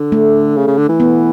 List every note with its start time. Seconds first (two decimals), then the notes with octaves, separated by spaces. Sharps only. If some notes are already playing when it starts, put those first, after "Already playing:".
Already playing: D3
0.12 A3
0.57 C#3
0.67 C#3
0.77 D3
0.89 E3
1.00 B3